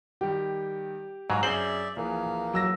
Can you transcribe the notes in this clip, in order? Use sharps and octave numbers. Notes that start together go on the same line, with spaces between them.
D#3 G3 G4
G#2 F#3 B4 F5 G#5 A#5
F#2 C4 G#4 C5 D5 E5 F#7
A#1 E3 A#3 G#4
F#3 E6 A#6